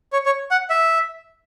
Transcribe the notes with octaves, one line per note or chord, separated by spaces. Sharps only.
C#5
C#5
F#5
E5